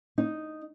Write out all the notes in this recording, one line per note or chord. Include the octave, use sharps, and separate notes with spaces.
D#4